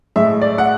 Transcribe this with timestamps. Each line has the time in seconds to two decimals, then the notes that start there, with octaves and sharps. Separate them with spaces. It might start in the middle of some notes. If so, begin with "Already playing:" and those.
0.16 A2 G#3 E5
0.42 D5
0.58 F#5